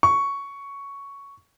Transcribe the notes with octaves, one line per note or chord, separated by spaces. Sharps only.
C#6